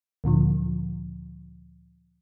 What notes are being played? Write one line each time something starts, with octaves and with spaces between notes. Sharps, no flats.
D2 A#2 D3 F3